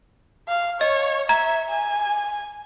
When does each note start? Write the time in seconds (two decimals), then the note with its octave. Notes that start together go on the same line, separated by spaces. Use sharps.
0.48 F5
0.81 C#5 D#5
1.29 E5 A#5 G#6
1.70 G#5